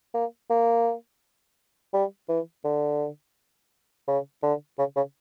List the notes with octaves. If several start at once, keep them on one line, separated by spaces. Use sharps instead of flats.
A#3
A#3
G3
E3
D3
C#3
D3
C#3
C#3